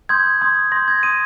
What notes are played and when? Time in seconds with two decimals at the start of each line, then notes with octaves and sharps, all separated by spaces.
0.09 C6 D#6 G6 G#6
0.41 C6 D#6 G6
0.72 C6 D#6 G6 A#6
0.88 G#6
1.03 C6 D#6 G6 D#7